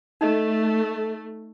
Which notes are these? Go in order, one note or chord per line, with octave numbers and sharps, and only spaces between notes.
A3 D#4 D#5